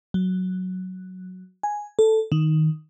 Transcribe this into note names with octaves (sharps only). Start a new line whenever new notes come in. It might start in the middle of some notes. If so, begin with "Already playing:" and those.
F#3
G#5
A4
D#3